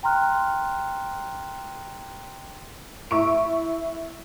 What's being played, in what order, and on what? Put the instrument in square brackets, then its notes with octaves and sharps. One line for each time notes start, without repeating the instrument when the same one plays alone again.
[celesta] G5 A#5 C6 F6 F#6
[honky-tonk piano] E4 E5 C#6 D7